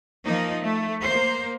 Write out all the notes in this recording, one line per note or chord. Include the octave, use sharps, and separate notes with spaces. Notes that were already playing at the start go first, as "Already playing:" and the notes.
F3 A#3 D#4
A3
A#3 C5